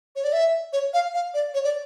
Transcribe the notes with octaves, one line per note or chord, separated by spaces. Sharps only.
C#5
D5
E5
C#5
F5
F5
D5
C#5
D5